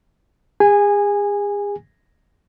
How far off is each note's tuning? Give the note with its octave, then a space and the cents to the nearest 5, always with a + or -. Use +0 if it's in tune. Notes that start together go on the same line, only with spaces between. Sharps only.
G#4 -40 G#5 -15